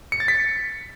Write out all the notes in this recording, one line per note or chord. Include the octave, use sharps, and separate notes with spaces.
C#7
A6
B6